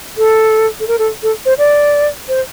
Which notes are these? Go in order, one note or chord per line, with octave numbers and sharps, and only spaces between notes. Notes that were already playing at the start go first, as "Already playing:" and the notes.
A4
A4
A#4
A4
A4
C5
D5
C5